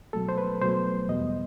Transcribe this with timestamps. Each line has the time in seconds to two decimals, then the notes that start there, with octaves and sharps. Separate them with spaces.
0.13 B2 F#3 A3 A4
0.29 C5
0.38 B4
0.61 B2 F#3 A3 C5
1.08 E2 B2 G3 D#5